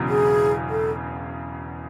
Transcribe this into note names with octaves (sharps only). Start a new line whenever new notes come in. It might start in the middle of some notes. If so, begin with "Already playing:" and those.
Already playing: E1 E2 C#3 F#3
G#4
A4